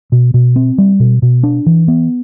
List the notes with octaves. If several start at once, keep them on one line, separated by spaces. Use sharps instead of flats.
B2
B2
C4
G3
B2
B2
D4
E3
B3